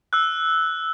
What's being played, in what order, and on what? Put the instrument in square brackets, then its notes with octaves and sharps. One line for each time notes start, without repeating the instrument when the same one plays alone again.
[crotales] E6 F#6